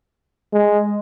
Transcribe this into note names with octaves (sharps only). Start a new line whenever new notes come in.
G#3